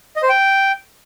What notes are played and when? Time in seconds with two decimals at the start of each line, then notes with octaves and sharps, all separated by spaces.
0.16 D#5
0.23 C5
0.29 G5